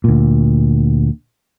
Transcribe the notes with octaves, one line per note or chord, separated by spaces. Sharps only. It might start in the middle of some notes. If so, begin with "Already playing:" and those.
D2 A#2